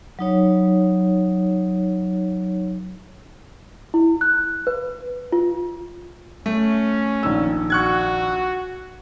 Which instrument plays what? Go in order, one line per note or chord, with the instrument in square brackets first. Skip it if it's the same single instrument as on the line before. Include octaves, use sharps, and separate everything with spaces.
[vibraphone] F#3 D#4 C#5
[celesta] E4
F#6
B4
F4
[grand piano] A3 [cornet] C#4
[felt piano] A#1 D#3 E6
[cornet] F#4 [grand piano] C#6 F#6 G#6